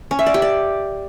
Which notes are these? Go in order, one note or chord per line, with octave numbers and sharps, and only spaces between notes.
C#4
E5
D5
G4
D5